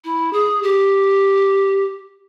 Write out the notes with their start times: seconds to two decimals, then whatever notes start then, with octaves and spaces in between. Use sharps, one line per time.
0.04 E4
0.33 G#4
0.63 G4